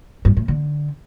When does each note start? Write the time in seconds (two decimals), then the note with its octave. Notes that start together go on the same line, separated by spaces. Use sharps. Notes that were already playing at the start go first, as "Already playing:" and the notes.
0.25 G2
0.37 A2
0.48 D3